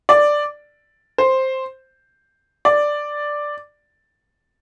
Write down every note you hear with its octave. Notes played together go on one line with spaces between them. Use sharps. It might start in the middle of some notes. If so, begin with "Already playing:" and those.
D5
C5
D5